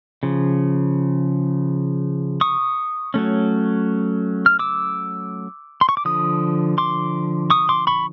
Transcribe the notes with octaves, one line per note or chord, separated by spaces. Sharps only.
C#3 F3
C#6 D#6
F#3 A3 C#4
F6
D6 E6
C6
C#6
D6
D3 F3 D#6
C6 D6
C#6 D#6
C6 D6
B5 C#6